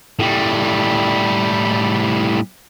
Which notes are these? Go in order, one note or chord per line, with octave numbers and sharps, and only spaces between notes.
A2 G3